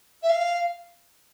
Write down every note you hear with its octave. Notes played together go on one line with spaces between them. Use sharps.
E5
F5